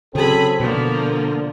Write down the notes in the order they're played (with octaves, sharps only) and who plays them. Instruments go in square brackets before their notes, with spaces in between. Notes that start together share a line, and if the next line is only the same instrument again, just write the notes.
[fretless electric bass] C#3 [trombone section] F#3 C4 A4 [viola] G#4 B5
[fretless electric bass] B2 [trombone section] D3 [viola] F3 A#3